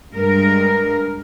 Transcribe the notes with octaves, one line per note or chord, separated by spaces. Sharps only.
G2 G#3 A#4